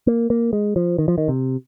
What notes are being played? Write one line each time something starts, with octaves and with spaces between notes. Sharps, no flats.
A#3
A#3
G#3
F3
D#3
F3
D#3
C3